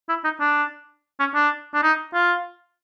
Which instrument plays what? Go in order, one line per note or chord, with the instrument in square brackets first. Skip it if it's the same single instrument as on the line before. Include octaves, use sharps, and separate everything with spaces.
[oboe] E4
D#4
D4
C#4
D4
D4
D#4
F4